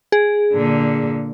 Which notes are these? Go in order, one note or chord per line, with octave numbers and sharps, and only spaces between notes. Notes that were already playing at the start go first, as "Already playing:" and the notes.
G#4
A#2 D3